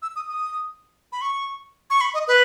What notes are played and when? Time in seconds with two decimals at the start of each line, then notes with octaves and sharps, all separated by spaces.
0.02 E6
0.16 D#6
0.29 D#6
1.12 B5
1.21 C#6
1.90 C#6
2.01 B5
2.14 D#5
2.28 B4